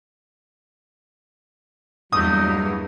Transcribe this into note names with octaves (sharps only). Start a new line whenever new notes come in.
E2 G2 E3 F#3 A3 A#3 D#4 D#6